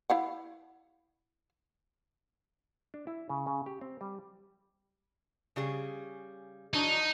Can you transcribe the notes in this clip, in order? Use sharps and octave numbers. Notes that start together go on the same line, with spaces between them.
E4 F5 F#5
D4
E4
C#3
C#3
G4
C4
G3
C#3 G3 G#4
E3 F#3 D4 D#4